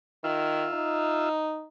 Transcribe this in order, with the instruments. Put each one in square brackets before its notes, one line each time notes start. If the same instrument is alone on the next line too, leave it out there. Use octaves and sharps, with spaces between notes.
[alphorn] D#3 [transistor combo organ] F4 E5
[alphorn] D#4